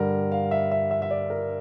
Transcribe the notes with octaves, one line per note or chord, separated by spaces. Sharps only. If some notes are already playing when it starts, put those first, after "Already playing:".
Already playing: G2 D3 G3 A#4
F5
E5
E5
E5
E5
D5
A#4